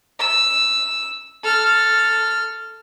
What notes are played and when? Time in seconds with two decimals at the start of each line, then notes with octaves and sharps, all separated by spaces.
0.19 E6
1.43 A4 F6